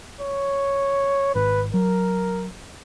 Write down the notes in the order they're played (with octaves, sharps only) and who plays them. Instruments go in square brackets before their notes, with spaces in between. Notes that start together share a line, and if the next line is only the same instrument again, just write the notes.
[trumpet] C#5
[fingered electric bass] G#1 [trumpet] B4
[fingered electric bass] F#3 [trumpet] A#4